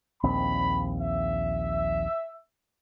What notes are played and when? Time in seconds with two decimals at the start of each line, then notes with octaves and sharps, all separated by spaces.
0.23 A#1 D#2 C4 B5
1.00 E5